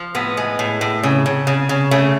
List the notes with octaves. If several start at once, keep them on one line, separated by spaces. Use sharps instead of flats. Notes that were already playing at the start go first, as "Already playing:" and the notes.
Already playing: F3
A2 B3
G#3
A2
A2
C#3
C#3
C#3
C#3
C#3 A3